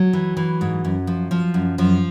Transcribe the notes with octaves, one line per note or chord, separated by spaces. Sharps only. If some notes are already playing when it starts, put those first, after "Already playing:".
Already playing: F#3
E3
E3
G#2
F#2
F3
F3
F#2
F#2 F3